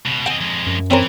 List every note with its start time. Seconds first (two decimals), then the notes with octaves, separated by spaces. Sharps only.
0.05 C#2 B2
0.26 C4 D#5 F#5 G#5
0.41 F2 G#3
0.66 F#2
0.91 E3 C4 C#4 A#4